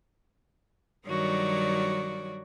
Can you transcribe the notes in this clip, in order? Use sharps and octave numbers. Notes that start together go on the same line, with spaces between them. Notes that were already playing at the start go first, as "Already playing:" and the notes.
G2 D#3 F#3 F#4 C#5 D5